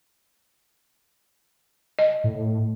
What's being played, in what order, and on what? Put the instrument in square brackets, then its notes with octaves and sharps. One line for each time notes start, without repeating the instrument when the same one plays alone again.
[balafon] D#5
[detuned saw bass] A2